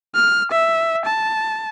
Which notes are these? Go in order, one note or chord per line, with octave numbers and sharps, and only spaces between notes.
F6
E5
A5